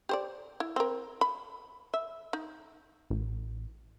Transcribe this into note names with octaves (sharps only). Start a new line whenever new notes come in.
G4 C5 D5
E4
C4 A#4
B5
E5
D#4
A1